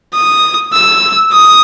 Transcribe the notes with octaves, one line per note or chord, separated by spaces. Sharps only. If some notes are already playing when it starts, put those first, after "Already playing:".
D#6
E6
D#6